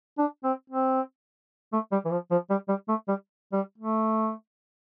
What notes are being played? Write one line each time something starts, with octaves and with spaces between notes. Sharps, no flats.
D4
C4
C4
A3
G3
E3
F3
F3
G3
G3
A3
G3
G3
A3